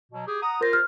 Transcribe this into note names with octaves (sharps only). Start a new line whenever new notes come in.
B2 F#3
G4 G#4
F#5 A#5 D#6
F4 A#4 C5 A#6
F6